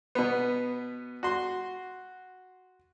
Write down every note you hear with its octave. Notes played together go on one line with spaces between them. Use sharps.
B2 B3
F#4 C6